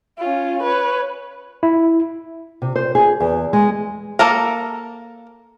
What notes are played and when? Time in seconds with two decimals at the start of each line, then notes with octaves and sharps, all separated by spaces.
0.18 C#4 F4
0.63 B4 C#5
1.63 E4
2.62 C3
2.76 C5
2.95 G#4
3.20 E2
3.53 G#3
4.19 A#3 A4 A#4